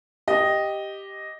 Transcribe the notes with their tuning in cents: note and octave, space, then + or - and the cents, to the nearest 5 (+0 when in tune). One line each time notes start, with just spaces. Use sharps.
G4 +0 D#5 +0